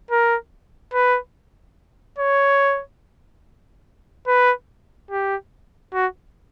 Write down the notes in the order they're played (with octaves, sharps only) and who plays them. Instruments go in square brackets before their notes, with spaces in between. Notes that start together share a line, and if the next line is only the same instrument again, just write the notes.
[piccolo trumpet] A#4
B4
C#5
B4
G4
F#4